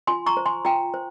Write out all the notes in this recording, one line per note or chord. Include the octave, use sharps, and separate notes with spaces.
F4 G#5 C6
A#5 C#6
C5
G#5 C6
F4 G5 A#5
C5